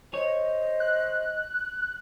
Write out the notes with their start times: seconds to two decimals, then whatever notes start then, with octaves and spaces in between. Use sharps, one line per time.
0.14 C5 C#5 D#5
0.80 F#6